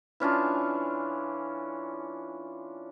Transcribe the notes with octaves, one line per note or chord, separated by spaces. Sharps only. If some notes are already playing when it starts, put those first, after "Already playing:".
E3 C#4 D4 F4